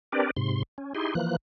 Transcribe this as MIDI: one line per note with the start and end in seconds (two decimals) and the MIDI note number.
0.12 0.31 60
0.12 0.31 62
0.12 0.31 67
0.12 0.31 70
0.12 0.31 71
0.12 0.31 74
0.37 0.63 44
0.37 0.63 48
0.37 0.63 84
0.78 0.93 61
0.95 1.14 63
0.95 1.14 64
0.95 1.14 67
0.95 1.14 68
0.95 1.14 84
1.15 1.36 52
1.15 1.36 53
1.15 1.36 58
1.15 1.36 90